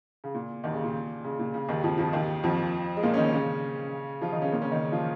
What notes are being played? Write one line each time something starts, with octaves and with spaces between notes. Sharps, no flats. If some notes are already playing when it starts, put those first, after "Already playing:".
C#3
A#2
D#2 D#3
C#3
A#2
C#3
A#2
C#3
D#2 D#3
F2 F3
F2 F3
D#2 D#3
F2 F3
G#3
A#2 A#3
C#4
D#3 D#4
C#3 C#4
F3 F4
D#3 D#4
C#3 C#4
A#2 A#3
C#3 C#4
D#3 D#4
F3 F4